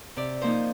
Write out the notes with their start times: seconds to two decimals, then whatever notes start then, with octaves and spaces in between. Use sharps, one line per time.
0.16 C3 D5
0.42 F3 A#3 D#4 C5